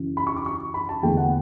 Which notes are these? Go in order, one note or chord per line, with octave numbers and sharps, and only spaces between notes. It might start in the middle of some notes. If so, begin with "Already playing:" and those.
Already playing: F#2 C#3 E3
B5
C#6
D6
C#6
B5
A5
E2 D3 A3 G5
F#5